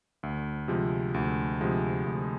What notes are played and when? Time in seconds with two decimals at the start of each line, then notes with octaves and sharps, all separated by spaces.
0.23 D2
0.68 C3 F3 G#3
1.14 D2
1.61 C3 F3 G#3
2.05 D2